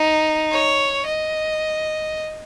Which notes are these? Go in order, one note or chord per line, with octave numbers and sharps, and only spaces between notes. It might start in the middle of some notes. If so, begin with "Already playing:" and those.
Already playing: D#4
C#5
D#5